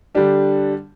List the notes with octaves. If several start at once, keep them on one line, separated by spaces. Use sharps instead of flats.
D3 G3 D4 G4